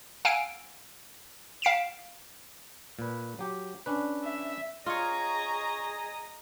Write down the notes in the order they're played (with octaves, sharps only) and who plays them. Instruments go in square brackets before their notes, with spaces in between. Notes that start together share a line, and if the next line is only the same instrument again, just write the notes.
[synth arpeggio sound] F5 F#5 G#5 E6 D7
F5 B6 D7 E7
[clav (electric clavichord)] A#2 B4
F#3 G4
C#4 D4 B4
[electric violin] E5
[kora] F4 C#5 [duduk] G#4 [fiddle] D#5 A#5 [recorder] C#6